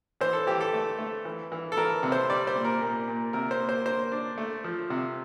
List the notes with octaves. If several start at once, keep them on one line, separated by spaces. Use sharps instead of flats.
E3 C5
A4
E3 G4
A4
A3
A3
E3
E3
A4
E3 A#4
C3
C5
G3 D5
C5
A#2
A#4
A#2
A#2
C3 A#4
C5
A#3
C5
A#3 C5
D4
A3
F3
C3